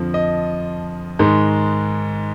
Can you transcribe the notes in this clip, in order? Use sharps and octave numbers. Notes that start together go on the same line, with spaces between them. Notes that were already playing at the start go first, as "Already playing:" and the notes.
Already playing: F2 D3 F3
D#5
G#2 D#3 G#3